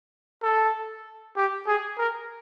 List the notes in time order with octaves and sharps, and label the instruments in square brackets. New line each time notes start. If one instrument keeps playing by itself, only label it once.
[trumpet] A4
G4
G#4
A#4